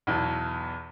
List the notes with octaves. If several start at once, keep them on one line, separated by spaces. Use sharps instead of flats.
B1 E2